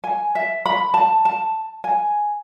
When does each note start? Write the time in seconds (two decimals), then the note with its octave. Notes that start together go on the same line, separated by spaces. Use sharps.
0.04 G#5
0.35 E5
0.66 B5
0.94 A5
1.25 A5
1.84 G#5